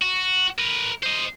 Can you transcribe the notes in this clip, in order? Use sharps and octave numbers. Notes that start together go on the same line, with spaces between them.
F#4
A#4 B4
C5 D#5